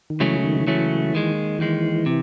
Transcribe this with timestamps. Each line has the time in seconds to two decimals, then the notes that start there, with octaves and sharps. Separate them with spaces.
0.10 D#3
0.20 C#2 C#3 E3 F#3 A3 C#4
0.44 D#3
0.60 D#3
0.67 C#2 C#3 E3 F#3 A3 C#4
1.13 D#2 D#3 G#3
1.59 D#2 D#3 E3 G#3
2.06 C3